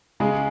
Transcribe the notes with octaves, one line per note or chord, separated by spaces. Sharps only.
C#3 G#3 G#4